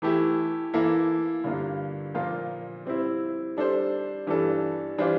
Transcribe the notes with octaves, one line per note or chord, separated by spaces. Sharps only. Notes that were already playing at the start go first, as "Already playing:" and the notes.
E3 A3 E4 G4
E3 A#3 E4 A4
G2 D3 G3 A#3 F4
A#2 F3 A#3 F4 A#4
G3 C4 E4
G3 D4 A4 C5
G2 E3 G3 D4 A4
E3 G3 D4 F4 C5